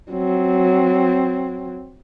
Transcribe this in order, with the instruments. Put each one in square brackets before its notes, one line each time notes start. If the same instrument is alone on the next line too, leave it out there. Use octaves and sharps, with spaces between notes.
[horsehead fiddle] F#3 C4